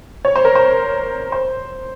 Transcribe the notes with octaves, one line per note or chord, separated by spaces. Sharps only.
C#5
C5
A#4
C5
C5